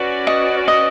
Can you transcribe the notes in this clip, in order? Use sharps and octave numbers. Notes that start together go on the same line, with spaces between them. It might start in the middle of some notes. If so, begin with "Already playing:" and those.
Already playing: C#4 F#4 B4 D5
D#5
D#5